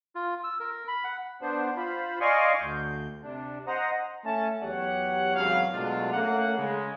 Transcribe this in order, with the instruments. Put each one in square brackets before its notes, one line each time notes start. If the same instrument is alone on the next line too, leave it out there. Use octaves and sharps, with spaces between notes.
[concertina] F4
E6
A#4
B5
F#5
[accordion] B3 D4 C5
F4 C5 B5
D5 D#5 F5 G#5 C6 C#6
D2 G6
C3 D4
C5 D#5 F#5 A#5
[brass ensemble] A3 C#4 E5 A5
E2 F#3 G4 C#5 F#5
G#1 E2 C#3 F#3 F5
B2 F#3 G#3 A3 D4 F4
A3 A#3 C#4 F5 F#5
C#3 G#3